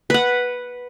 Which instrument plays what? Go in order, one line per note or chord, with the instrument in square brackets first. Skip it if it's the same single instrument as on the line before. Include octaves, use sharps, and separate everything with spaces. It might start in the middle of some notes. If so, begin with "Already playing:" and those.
[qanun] B4 F#5